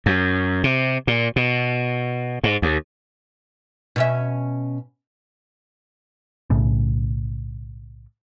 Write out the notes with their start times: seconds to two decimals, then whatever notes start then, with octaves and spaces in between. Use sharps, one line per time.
0.06 F#2
0.64 C3
1.07 A#2
1.36 B2
2.44 G#2
2.62 D#2
3.96 B2 C#4 E5
6.50 B1 A2 C#3